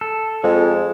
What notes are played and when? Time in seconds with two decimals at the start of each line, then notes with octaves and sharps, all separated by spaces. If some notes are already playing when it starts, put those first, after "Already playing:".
0.01 A4
0.44 F2 G#3